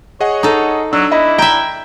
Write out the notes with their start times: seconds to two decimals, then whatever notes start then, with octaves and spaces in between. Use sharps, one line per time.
0.21 G#4 C#5 D#5 F#5
0.43 D#4 A4
0.93 F#3 D4 E6
1.12 E4 D#5 B5
1.38 E5 G5 A#5